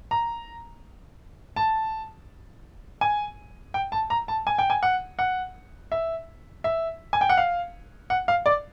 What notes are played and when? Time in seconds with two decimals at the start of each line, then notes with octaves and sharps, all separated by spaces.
0.11 A#5
1.56 A5
3.01 G#5
3.74 G5
3.92 A5
4.10 A#5
4.28 A5
4.47 G#5
4.58 G5
4.70 G#5
4.83 F#5
5.19 F#5
5.92 E5
6.64 E5
7.13 G#5
7.21 G5
7.29 F#5
7.37 F5
8.10 F#5
8.28 F5
8.46 D5